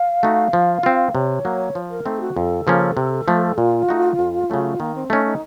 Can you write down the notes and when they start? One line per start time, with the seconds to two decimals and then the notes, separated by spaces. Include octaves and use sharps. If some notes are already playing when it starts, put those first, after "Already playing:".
Already playing: F5
0.23 A3 D#4 F#4
0.53 F3
0.83 C4 F4
1.14 C3 C#5
1.45 F#3 A#3
1.75 F3
1.90 A#4
2.06 A3 C4 D#4 A4
2.20 F#4
2.36 F2 A4
2.67 C#3 F3 A#3 C#4
2.97 C3
3.28 F3 A3
3.57 A#2 F4
3.89 A3 D#4 F#4
4.19 F2
4.50 C#3 F#3 A3 C#4
4.80 D#3 A#3
4.95 C4
5.10 A3 C#4 D#4
5.25 D#4